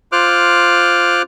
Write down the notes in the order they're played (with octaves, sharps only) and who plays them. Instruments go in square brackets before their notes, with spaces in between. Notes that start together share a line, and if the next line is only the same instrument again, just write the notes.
[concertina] F4 C5 D6 F6 F#6